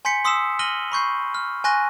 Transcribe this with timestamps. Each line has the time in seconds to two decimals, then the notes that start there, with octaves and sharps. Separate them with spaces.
0.05 G#5 C6 G6 B6 C#7
0.25 C6 D#6 E6 B6 C7 E7
0.59 F6 A#6 D#7 F#7 G7
0.92 B5 C#6 G6 C7
1.34 F6
1.64 G#5 C6 C#6 F#6 A#6 D#7